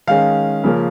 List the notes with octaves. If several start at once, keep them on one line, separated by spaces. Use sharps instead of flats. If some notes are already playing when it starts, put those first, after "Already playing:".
D#3 G#3 C#4 F5
C#3 F3 A#3 C#4